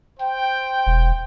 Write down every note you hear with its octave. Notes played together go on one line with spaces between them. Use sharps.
C5 G5
E1